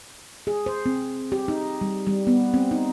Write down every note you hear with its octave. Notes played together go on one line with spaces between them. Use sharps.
G#4
C5
C4
G4
D#4
G3
G3
B3
C4
D#4